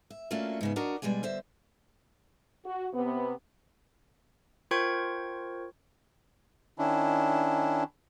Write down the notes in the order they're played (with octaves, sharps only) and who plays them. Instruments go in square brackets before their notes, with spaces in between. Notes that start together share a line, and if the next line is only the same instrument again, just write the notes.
[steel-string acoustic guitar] E5
A3 A#3 C#4 D4 F4 F#4
G#2 C#3 B3
F#3 D4 F#4 A#4 D#5
B2 G3 G#3 D4 G#5
D3 C5 E5
[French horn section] F#4
C3 B3
[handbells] F4 A#4 C5 G5 C#6 G#6
[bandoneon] D#3 C#4 D4 E4